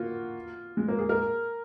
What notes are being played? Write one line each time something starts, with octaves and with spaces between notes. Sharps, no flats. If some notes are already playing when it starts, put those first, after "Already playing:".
Already playing: A#3 F4 F#4
G#3
A#3
G#4
A#4